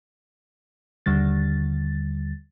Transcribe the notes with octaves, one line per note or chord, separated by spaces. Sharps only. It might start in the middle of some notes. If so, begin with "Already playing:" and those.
D#2 D3 G3 A6